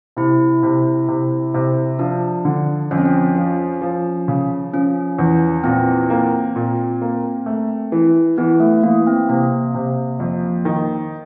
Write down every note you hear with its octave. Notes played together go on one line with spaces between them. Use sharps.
C3 E4
C3
C3
C3
F3 D4
D3
F2 C#4
C4
C#4
F3
F3
C#3
F3 C#4
E2
A#2 C4
A#3
A#2
A#3
A3
E3
E3 B3
A3
E3 A#3
C4
C3 A#3
C3
F2
D#3